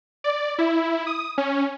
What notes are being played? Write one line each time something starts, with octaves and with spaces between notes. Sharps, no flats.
D5
E4
D#6
C#4